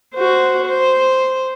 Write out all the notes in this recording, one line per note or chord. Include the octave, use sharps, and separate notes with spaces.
F#4 C5
C5